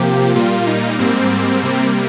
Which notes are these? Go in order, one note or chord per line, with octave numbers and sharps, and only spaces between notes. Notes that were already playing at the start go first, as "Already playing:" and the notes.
Already playing: C3 F3 A#3 G4
A#2 G3 A#3 F4
D#4
G#2 G3 A#3 C4
C3 G3 A#3